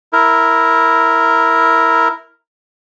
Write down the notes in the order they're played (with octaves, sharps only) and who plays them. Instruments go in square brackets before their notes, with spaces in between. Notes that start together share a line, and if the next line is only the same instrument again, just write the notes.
[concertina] E4 A#4